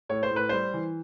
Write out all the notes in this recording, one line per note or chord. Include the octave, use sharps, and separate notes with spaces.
A2 C#5
C5
A2
B4
G3 C5
E3